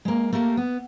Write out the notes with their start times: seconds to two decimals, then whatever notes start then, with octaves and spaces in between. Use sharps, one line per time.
0.05 G#3 A#3
0.33 A3 A#3 G4 A4 A#4
0.57 B3